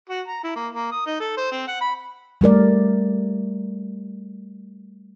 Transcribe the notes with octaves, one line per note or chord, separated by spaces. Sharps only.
F#4
A#5
E4
A#3
A#3
D#6
D#4
A4
C5
C4
F#5
B5
G3 A3 A#4 D5